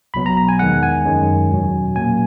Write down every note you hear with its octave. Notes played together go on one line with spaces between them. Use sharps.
B1 B2 F#3 B3 B5
A#5
A#5
G#5
E2 D#3 G#3 F#5
G#5
F#2 D#3 G#3 C#4
E2 B2 F#3 C#4
A#2 F#3 A#3 C#4 G#5